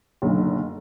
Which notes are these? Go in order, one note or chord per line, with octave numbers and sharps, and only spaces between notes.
F#1 B1 F#2 D3